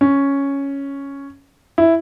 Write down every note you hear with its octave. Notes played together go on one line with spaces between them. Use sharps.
C#4
E4